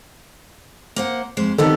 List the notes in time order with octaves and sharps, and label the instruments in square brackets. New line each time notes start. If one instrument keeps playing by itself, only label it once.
[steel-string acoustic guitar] A#3 C5 F#5
F2 G#3 C5
[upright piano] D#3 A4 [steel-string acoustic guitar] G3 B3 C4